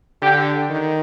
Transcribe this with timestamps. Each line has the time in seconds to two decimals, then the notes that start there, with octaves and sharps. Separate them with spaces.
0.22 D3 G4
0.70 D#3